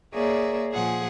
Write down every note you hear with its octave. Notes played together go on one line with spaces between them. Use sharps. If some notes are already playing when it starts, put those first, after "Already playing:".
A#3 G#4 A#4 C#5 D5 E5
A#2 F3 G#4 F#5 G#5